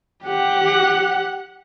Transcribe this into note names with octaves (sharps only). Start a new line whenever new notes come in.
G4 F#5